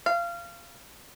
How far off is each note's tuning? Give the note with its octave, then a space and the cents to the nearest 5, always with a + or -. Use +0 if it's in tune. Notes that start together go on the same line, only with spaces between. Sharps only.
F5 -25